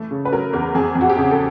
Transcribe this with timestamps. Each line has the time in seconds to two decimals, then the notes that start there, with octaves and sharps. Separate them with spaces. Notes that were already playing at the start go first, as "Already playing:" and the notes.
Already playing: E3 A3
0.11 C#3
0.25 B4
0.32 F#3 A#4
0.53 E2 A#4
0.75 F2 G#4
0.95 F2
1.01 F#4
1.09 G4
1.17 C#3 G#4
1.31 A4